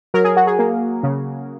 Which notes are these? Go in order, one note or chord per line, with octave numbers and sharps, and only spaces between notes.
F#3 A#4
G#4
F#4
G#4
A#3
C#3